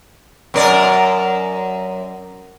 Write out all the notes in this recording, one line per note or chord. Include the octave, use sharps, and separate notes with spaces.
F#2 A#4 D5